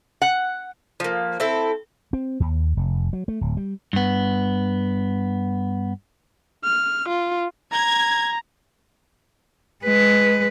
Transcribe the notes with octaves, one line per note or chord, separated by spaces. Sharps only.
F#5
F3 A#3
C4 E4 A4
C4
D#2
F1
F#3
A3
D1
G3
G2 B3
F6
F4
A#5 G#6
G#3 B4